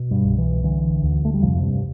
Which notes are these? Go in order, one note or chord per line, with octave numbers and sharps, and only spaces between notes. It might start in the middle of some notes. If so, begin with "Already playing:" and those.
Already playing: B2
G2 G3
C2
E3
D3 E3
D2
A3
G3
F2 C3 F3
G2 G3